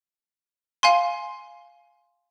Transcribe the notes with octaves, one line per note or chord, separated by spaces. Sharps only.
F5 G#5 C6